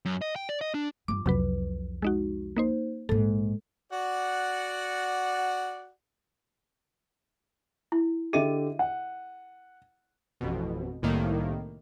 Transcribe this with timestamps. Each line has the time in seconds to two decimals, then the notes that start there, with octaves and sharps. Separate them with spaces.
0.05 F#2
0.22 D#5
0.36 G5
0.49 D5
0.61 D#5
0.74 D4
1.08 G2 F3 D6
1.26 C2 F2 C3 F#3 B4
2.02 G#3 D#4 F#4
2.56 A#3 D#4 C5
3.09 A#1 G#2 A4
3.92 F#4 D5 F#5
7.92 E4
8.33 D3 G4 G#4 D#5 E5 D#7
8.79 F#5
10.41 A1 F2 B2
11.03 C2 A2 D#3 A#3